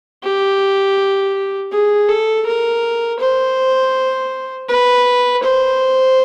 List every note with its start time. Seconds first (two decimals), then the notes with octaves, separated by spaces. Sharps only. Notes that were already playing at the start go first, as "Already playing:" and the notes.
0.23 G4
1.72 G#4
2.08 A4
2.46 A#4
3.19 C5
4.69 B4
5.43 C5